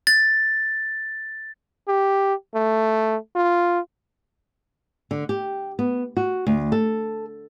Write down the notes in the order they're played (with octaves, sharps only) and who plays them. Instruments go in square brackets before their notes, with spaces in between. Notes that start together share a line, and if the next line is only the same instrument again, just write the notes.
[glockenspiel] A6
[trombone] G4
A3
F4
[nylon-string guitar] D3
G4
B3
F#4
D2
A4